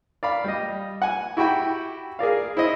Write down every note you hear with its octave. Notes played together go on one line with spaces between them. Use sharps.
D5 F5 B5
G3 D#5
F#5 G#5
E4 F#4 G4 G5 B5
G#4 A#4 D5 F5
E4 C5 D#5